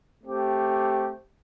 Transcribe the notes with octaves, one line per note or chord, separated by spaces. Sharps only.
A3 C4 G4